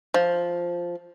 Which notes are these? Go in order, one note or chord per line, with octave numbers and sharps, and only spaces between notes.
F3